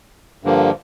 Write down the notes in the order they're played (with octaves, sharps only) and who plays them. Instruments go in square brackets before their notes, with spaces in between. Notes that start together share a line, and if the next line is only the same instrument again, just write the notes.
[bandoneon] G2 D3 F3 A#3